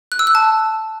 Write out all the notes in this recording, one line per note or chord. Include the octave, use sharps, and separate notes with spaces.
F#6
E6
F#6
A5